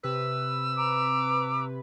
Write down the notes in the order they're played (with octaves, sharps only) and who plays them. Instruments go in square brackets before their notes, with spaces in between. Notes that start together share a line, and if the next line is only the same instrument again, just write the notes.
[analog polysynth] C3 B4 [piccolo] E6
[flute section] A#5 D6